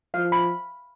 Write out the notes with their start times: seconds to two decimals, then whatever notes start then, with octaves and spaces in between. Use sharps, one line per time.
0.14 F3 F5
0.32 B5